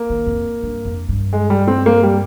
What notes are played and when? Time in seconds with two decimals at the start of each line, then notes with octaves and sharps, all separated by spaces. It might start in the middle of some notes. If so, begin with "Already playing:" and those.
Already playing: A#3
0.10 D#3
0.26 F2
0.63 G2
0.85 F2
1.09 G2
1.33 G#3
1.50 G3
1.68 C4
1.86 A#3
2.03 G3